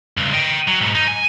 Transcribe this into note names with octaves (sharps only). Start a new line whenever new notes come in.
C#2 G2
D#5 G5
F#3
G#2 B2
D#4
G#5